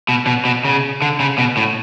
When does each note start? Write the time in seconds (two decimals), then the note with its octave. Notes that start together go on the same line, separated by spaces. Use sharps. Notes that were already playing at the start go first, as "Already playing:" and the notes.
0.09 B2
0.27 B2
0.45 B2
0.65 C#3
1.02 D3
1.20 C#3
1.38 B2
1.57 A2